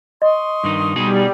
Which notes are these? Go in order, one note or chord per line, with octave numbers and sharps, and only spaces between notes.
D#5 C6 C#6 D#6
G2 D#3 D#4
B2 G3 D#4 G#4